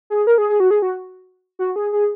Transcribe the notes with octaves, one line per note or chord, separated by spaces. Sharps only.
G#4
A#4
G#4
G#4
F#4
G#4
F#4
F#4
G#4
G#4